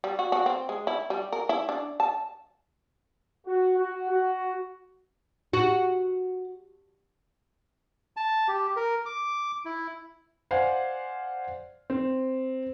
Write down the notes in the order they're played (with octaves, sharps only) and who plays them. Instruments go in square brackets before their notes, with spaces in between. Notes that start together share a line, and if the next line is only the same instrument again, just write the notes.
[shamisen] G3
F#4
F#4
C4
G#3
E4
G3
A#4
E4
D4
A5
[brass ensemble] F#4
F#4
F#4
[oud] F#4
[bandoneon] A5
G4
A#4
D6
E4
[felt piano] C5 D5 F5 F#5 G#5
C4